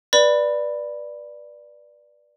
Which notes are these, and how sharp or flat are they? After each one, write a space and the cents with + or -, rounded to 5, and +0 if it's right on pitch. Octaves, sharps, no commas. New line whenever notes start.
B4 -25 D5 +5 B5 +0